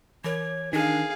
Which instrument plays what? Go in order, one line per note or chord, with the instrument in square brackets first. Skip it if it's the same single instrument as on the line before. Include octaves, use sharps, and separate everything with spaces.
[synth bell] E3 A#4 [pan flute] C#5
[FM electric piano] D#3 [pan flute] D4 [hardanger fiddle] G#4 F5